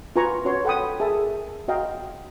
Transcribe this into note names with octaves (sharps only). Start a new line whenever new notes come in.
F4 F#4 B4 G#5 A#5 C#6
C#4 F#4 B4 C#5 C6
A4 F#5 G5 B5 D#6
G#4 A#4 E5 A5
F#4 D#5 F5 G5 A#5